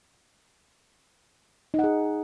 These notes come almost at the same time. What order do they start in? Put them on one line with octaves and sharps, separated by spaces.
D#4 F#5 G#4